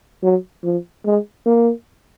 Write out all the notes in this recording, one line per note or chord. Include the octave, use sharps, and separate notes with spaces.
F#3
F3
G#3
A#3